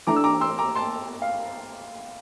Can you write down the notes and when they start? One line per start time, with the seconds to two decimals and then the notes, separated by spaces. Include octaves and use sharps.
0.07 E3 A3 D4 A#5 D6
0.16 E6
0.24 A#5 D6
0.41 C6 E6
0.58 A#5 D6
0.75 A5 C6
1.22 F5